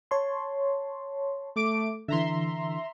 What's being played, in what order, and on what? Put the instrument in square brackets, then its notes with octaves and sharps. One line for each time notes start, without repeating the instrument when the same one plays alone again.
[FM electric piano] C#5 A5 C6
[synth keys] A3 D6 D7
[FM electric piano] D3 E3 [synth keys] E5 A#5 C6